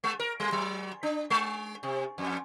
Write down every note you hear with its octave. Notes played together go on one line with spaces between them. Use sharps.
G#3
A#4
G3
F#3
D4
G#3
C3
F2